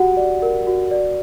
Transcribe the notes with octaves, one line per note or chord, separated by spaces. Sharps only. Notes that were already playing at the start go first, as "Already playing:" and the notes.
Already playing: F#4 G4 F#5
D5
A#4
F#4
D5